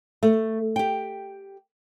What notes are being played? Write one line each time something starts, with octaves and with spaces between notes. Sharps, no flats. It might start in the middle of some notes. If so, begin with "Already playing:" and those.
A3
G4 G5